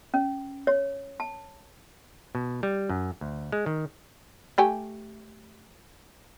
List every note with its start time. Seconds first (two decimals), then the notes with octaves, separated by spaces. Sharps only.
0.14 C#4
0.67 C#5
1.20 A5
2.35 B2
2.63 G3
2.89 F#2
3.21 D2
3.52 G#3
3.66 D#3
4.58 A3 G4 G#5